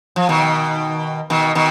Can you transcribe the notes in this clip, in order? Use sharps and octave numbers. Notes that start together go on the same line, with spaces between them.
F3
B2 D#3
B2 D#3
B2 D#3